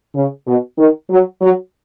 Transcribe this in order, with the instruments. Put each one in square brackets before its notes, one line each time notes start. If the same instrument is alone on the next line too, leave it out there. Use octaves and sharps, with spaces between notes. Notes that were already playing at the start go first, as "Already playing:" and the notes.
[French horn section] C#3
B2
D#3
F#3
F#3